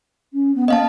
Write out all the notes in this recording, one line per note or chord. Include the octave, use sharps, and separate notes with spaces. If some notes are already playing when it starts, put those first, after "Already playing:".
C#4
B3
A#3 D#5 F5 A5